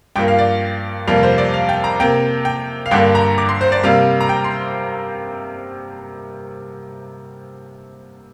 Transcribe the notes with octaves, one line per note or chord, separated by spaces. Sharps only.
G2 F3 A#3 G5
F5
D5
F2 C3 G3 A#3 F5
C5
D5
F5
G5
A#5
C3 A#3 G5
G5
F5
G2 D3 A#3 G5
A#5
D6
C6
C5
D5
C3 G3 A#3 F5
A#5
G5
C6